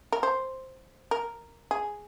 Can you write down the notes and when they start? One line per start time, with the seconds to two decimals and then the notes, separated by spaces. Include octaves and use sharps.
0.12 A#4
0.23 C5
1.11 A#4
1.71 G#4